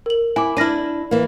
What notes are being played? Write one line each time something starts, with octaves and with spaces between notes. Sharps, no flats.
A#4 F#7
E4 G#5 D6
D4 E4 F6 A#6 D#7
E3 A#3